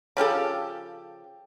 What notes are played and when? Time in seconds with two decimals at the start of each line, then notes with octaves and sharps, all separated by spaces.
0.17 C#3 F3 G4 A4